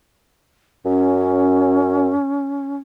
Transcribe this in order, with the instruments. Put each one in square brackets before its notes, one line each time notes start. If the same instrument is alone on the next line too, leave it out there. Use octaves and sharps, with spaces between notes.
[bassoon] F#2 [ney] C#4